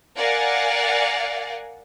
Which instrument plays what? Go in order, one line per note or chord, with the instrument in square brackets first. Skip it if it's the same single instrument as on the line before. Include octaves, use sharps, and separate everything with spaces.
[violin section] A#4 D5 F5 F#5 G#5